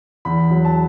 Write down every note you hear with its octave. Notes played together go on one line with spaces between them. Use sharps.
E2 B5
F#3
A5